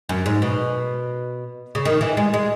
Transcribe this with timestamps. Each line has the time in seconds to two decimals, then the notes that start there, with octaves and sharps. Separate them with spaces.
0.09 F#2
0.26 G#2
0.42 B2
1.75 C#3
1.85 D#3
2.01 E3
2.17 G#3
2.34 G#3